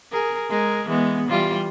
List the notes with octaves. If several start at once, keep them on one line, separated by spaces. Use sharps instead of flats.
G#4 A#4
G#3 G#4 A#4
E3 G#3 B3
E3 G3 F4